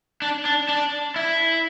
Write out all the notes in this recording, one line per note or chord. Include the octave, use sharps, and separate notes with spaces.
D4
D4
D4
E4